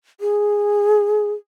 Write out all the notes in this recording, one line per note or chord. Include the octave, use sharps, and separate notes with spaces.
G#4